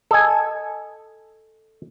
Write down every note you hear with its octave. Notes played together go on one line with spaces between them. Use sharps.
A4 D#5 G#5